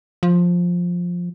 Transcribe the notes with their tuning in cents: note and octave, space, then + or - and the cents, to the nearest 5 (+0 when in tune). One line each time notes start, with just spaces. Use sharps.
F3 +10